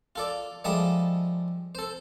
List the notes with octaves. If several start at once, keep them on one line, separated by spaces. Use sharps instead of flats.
F4 A4 D5
F3 G3 G#3 A4 E5 D#6
A4 C5